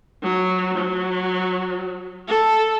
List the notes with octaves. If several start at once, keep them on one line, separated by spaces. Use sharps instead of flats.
F#3
F#3
A4